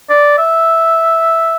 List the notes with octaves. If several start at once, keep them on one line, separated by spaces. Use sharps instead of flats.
D5
E5